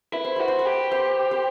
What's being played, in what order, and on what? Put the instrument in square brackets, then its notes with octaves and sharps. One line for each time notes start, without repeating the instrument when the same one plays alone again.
[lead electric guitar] E4 [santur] B4
[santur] C5
[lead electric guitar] F#4 [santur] B4
[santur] C5
B4
[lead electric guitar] G4
[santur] C5
C5